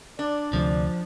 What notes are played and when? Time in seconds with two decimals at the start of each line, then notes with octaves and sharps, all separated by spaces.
0.19 D4 D5
0.53 D2 C3 F3